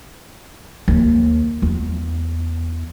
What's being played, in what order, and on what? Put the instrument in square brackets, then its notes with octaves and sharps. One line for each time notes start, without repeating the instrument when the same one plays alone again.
[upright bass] D#2
E2